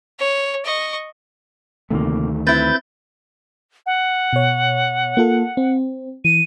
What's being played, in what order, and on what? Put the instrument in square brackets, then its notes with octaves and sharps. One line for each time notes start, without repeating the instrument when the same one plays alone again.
[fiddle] C#5
D#5 C#6
[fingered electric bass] D2 D#3 A3 [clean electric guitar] C3 F3 A#3
[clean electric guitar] C4 [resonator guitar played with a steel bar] E4 B4 [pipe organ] G6 A6
[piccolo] F#5
[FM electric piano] B2 C#5
A#3 F4 A4
C4
[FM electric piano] E3 [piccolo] D#7